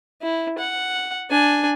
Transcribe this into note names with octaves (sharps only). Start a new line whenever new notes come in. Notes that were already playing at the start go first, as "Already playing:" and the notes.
E4
F#5
D4 G#5